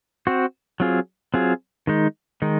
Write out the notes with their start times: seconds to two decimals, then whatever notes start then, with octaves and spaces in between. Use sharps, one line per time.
0.27 C4 F#4 C5
0.80 F#3 C4 F4 G#4
1.34 F#3 C4 F4 G#4
1.87 D#3 G#3 D#4
2.42 D#3 G#3 D#4